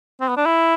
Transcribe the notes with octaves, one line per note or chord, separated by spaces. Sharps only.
C4
B3
D4
E4